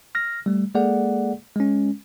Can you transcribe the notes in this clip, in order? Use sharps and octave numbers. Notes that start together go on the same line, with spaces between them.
F6 A#6
G3 A3
G#3 A#3 G#4 A4 D5 F#5
G#3 C#4